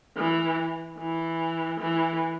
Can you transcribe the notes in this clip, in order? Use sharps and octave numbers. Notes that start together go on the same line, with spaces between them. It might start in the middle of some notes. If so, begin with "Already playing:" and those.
E3
E3
E3